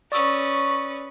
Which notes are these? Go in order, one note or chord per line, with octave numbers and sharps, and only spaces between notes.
C#4 B4 D5 C#6 D#6 E6